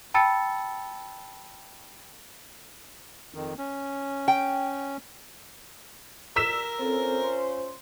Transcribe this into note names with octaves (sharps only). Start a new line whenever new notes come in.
G5 A5 B5 E6 A6 C#7
F2 D#3
C#4
G5
A#4 E6 B6 E7
C4 C#4 F4 A4 C5
C6